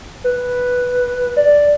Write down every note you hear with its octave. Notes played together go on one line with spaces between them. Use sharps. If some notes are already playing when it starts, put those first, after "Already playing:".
B4
D5